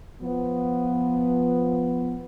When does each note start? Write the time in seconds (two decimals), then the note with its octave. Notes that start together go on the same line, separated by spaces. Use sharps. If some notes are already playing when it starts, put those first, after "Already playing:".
0.22 F3 B3